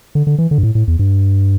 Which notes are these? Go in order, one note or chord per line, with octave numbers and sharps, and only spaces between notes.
D3
D3
E3
D3
G2
A2
A2
E2
G2